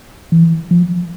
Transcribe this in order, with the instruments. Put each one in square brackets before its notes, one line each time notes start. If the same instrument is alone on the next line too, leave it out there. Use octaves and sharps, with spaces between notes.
[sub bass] E3
F3